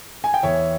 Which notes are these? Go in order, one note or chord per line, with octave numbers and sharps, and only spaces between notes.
G#5
G5
E2 C#5 E5